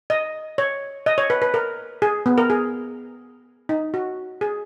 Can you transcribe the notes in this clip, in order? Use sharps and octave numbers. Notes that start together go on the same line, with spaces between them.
D#5
C#5
D#5
C#5
B4
B4
A#4
G#4
B3
A#4
G#4
D#4
F#4
G#4